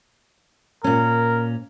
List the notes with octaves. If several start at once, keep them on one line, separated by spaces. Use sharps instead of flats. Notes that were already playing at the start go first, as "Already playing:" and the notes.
A#2 C#4 A#4